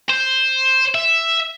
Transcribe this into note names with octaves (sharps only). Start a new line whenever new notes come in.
C5
E5